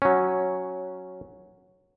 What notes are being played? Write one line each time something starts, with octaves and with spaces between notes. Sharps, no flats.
F#3 C#4